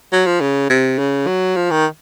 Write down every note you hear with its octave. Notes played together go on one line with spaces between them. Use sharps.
F#3
F3
C#3
C3
C#3
F#3
F3
D#3